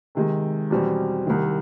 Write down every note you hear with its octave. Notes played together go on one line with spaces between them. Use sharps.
C3 D#3 G#3
E2 B2 G3 C4
C2 C3 D#3